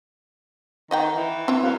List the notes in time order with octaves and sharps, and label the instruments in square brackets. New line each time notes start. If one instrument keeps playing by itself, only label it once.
[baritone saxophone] D#3 [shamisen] D#5 F#5 G5
[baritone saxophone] E3
[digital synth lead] C4 [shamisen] E4 F4
[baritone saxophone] F#2 [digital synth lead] F5